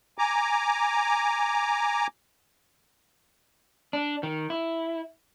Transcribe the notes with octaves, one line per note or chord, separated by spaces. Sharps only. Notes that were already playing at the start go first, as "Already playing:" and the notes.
G#5 A#5 D6
D4
D#3
E4